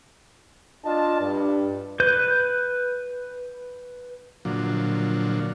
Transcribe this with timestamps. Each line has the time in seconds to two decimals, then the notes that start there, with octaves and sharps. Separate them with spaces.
0.85 D4 F4 D#5 A5
1.20 G2
2.00 B4 G6
4.45 A#2 D3 F3 F#3